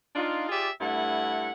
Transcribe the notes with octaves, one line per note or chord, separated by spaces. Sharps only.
D4 D#4 F4
F4 G4 G#4 D5 E5
G2 A3 E4 F#5